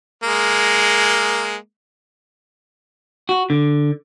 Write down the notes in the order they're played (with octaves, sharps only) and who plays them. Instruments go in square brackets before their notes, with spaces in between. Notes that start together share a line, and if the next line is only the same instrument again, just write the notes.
[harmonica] G#3 A#3
[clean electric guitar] F#4
D3